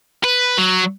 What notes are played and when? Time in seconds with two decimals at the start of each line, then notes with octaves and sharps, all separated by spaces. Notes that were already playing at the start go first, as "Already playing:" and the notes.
0.24 B4
0.58 F#3